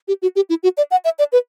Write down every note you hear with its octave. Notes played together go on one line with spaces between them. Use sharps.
G4
F#4
G4
E4
F#4
D5
F#5
E5
D5
B4